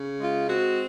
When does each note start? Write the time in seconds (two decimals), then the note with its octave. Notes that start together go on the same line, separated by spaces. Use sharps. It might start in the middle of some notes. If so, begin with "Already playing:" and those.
Already playing: C#3
0.19 G#3 F4
0.48 C4 F#4